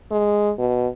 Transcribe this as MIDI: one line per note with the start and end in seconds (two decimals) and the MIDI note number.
0.11 0.52 56
0.58 0.87 47